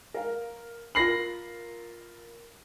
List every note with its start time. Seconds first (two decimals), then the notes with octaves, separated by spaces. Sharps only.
0.14 A#4 F5
0.95 F4 A#4 B5 A#6 C7 F#7